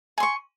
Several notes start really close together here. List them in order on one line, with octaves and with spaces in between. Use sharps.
G#5 C6 C#6